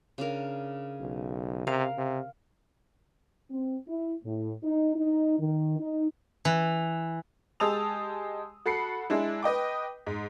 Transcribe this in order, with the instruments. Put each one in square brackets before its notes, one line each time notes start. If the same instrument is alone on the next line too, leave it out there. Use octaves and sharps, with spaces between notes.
[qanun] C#3 D4 A#4
[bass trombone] B1
[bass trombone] C3 [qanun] A#4 F5
[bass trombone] C3
[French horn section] C4
E4
A2
D#4
D#4
D#3
D#4
[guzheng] E3
[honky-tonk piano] G#3 G4 A5 D#6 E6 F7
F#4 A4 B5 C7 C#7
G#3 D4 E4
B4 D#5 G5 D6
G#2